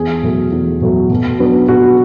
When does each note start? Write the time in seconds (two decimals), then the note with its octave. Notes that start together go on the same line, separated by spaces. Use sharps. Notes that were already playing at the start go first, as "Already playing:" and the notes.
Already playing: E2 G#4
0.23 B2 F#3 A3
0.52 E2
0.81 B2 F#3 A3
1.10 B2
1.39 F#3 B3 D4
1.68 B2 F#4